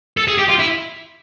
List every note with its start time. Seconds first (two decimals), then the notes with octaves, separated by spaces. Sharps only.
0.17 A4
0.28 G#4
0.38 G4
0.48 F4
0.59 E4